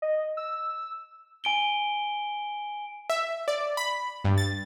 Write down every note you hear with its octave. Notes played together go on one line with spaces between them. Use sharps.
D#5
E6
G#5 D7 G7
E5
D5
B5
G2
A6